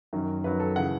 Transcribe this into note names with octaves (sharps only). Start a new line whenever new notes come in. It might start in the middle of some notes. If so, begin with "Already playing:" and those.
F#2 D#3 F#3
F#2 D#3 F#3 B4
A4
C#3 E3 F#5